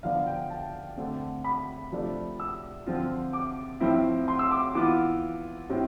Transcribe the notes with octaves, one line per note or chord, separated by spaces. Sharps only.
D3 F3 B3 D4 F5
G5
A5
D3 A3 C4
B5
C3 F3 A3 D4 F4
E6
D3 F3 C4 F4
D6
A2 F3 C4 E4
C6
E6
D6
E3 B3 F4 D6
A2 G3 C4